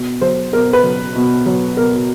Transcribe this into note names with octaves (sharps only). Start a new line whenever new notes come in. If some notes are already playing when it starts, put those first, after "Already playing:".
Already playing: B2
F#3 C5
B2 A#4
B4
F#3
B2
F#3
B2 A#4